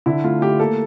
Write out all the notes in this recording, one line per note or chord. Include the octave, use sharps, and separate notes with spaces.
D3 E4
A3 F4
A3 G4
A#3 A4